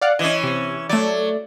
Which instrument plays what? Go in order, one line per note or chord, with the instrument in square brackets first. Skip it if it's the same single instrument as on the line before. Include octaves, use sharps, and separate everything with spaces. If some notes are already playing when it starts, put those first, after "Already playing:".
[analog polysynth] D5 F5 F#5
[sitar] E3 C#4 [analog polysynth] D#5
[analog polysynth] C3
[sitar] F#3 [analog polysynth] A3 D5